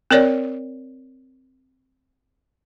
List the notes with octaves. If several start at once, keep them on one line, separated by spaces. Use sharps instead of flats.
C4 A#4 C#5 D5